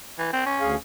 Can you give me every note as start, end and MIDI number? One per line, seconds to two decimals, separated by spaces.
0.18 0.32 52
0.33 0.45 60
0.46 0.75 61
0.61 0.76 38
0.61 0.76 68
0.61 0.76 77